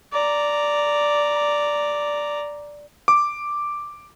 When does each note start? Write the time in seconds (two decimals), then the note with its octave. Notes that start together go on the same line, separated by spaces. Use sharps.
0.13 D5 A#5
3.08 D6